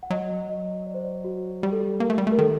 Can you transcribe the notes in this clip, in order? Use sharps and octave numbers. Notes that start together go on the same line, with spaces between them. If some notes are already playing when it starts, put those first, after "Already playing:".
F#5
F#3 D#5
D#5
D5
C5
D5
F#4
G3 G4
A4
G4
A#3 A#4
A3
G3
A3
A#4
D#3 A4